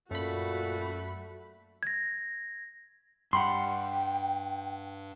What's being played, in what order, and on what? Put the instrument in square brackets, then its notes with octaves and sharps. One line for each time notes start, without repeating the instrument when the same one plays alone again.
[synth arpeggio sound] F#2 B5 [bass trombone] A#2 [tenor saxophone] A3 [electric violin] F#4
[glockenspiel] G#6 A#6
[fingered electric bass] G2 [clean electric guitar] F#5 B5 C6 [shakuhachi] G5